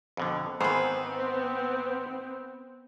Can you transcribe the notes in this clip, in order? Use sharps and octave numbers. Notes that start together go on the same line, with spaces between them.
F2 B2 D3
G#2 D#3 E3 B3 C4 B4 C5